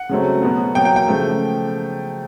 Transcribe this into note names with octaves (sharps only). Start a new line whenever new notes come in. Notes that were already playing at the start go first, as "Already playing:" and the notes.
Already playing: F#5
C#3 F#3 A3 C4
B2 F#3 B3
B2 F#3 A#3 G5
G5
G5
C#3 F3 A3